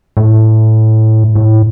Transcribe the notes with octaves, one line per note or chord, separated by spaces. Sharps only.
A2
A2